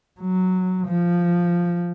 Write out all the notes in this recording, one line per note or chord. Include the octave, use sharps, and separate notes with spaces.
F#3
F3